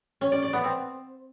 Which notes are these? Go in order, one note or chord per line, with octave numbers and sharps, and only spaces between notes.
C#4
D5
D5
B3
C4